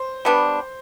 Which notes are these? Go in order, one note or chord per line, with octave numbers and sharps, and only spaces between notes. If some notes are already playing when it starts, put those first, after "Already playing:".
Already playing: C5
G3 B3 D4